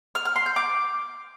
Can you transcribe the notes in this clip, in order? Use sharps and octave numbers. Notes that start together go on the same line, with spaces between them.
F6
F6
C6
G6
D6